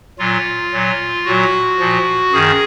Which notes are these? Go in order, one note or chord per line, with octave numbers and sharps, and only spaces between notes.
A#2 F#3 F4
A#2 F#3
A#2 F#3 F#4
A#2 F3
F#2 D#3 G#4